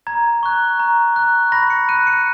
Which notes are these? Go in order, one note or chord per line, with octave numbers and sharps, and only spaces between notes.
A#5 G#6
C#6 F#6
A#5
C#6 F#6
B5 A#6
C#7
F#6 D#7
C#7